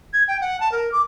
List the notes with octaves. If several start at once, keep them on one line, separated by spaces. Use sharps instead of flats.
G#6
G5
F#5
A5
A#4
D6